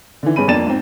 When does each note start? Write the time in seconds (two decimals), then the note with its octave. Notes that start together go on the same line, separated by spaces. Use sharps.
0.23 D3 E3
0.36 G2 G#3 C#4 B5 D#7
0.48 F2 A#3 D4 A6 E7
0.67 G#2 C4